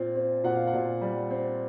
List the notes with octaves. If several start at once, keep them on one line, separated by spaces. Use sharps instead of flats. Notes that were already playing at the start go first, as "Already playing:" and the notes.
Already playing: A#2 C4 F4
C4
A#2 F#5
F5
F#5
A#2
G3
C4